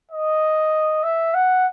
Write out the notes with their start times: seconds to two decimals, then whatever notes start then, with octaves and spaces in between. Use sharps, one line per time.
0.12 D#5
1.03 E5
1.34 F#5